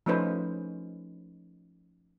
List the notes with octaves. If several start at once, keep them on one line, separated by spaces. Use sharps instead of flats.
F3 A3 C#4 D#4 B4 C5